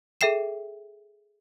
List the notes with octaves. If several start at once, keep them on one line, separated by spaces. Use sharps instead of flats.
G#4 A4 E5 G5 C7 E7